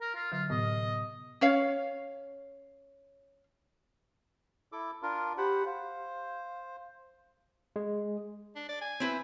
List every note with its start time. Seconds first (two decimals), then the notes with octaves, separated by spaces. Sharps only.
0.01 A#4
0.15 F4
0.32 D3 F#3 F4
0.50 A2 C3 B3 D#5
1.41 C#4 C#5 F5
4.72 E4 A4 D6
5.02 D4 F4 A#4
5.38 G4 C5 F#5 B5
5.66 C5 F5
7.76 G#3
8.56 D4
8.68 D5
8.81 G#5
9.00 C4 E4 B4